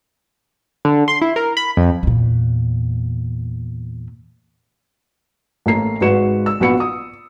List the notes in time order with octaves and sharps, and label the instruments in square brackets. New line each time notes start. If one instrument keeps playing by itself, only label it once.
[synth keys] D3
C6
E4
A#4
B5
F2
[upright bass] E2 A#2
[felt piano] A1 A3 A#3 A#5 C7
G#1 G#2 F#4 B4 C#7 E7
E6
A#1 B3 F#4 B5 C#7
D#6